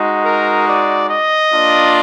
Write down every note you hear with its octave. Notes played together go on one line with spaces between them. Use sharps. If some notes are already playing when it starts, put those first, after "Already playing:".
Already playing: G#3 D#4 F#4
A#4
D5
D#5
A#3 D4 F4